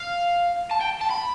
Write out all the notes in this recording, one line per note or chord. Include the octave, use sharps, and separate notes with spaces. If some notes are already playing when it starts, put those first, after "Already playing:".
Already playing: F5
A5
G5
A5
B5